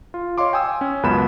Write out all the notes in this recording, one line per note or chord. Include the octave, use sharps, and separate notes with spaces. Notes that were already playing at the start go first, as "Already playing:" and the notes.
F4
C#5 D#5 F5 C6 D6
G5 G#5 D#6 E6
C#4
C#2 F#2 B3 B5 E7